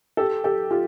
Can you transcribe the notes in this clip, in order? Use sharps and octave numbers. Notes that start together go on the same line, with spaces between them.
G4 A4
G4 A4
F4 G4